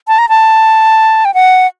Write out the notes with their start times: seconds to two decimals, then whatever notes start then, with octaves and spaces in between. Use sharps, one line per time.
0.08 A5
0.18 A#5
0.29 A5
1.25 G5
1.34 F#5